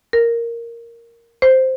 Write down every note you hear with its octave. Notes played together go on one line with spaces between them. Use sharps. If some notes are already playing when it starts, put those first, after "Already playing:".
A#4
C5